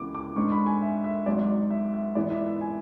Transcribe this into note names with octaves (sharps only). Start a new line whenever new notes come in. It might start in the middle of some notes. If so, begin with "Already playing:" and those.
Already playing: C#2 C#3 E3 B3 D6
D6
G#2 G#3 D4 C#6
B5
G#5
E5
E5
G#1 G#2 F#3 D5
E5
E5
G#2 E3 B3 D5
E5
E5
G#5